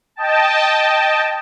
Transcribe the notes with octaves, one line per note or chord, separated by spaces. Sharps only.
D#5 G5 A5